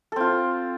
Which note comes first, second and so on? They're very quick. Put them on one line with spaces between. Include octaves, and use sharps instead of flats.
A4 C4 F4